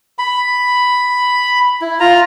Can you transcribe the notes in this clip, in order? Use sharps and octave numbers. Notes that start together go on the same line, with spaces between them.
B5
E4
F4 A#5